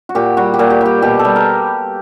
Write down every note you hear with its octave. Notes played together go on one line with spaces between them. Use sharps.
F#4
A#2 G4
G3 F#4
G4
A#2
G4
G3 G4
B2 G4
A4
G3
A#4